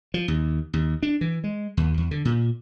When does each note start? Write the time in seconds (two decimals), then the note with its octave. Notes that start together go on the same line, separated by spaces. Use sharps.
0.14 F3
0.28 D#2
0.73 D#2
1.03 D4
1.21 E3
1.44 G#3
1.77 D#2
1.98 E2
2.11 D3
2.25 A#2